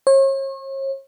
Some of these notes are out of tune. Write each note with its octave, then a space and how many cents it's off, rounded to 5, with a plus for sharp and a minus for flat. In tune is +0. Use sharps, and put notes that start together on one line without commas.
C#5 -40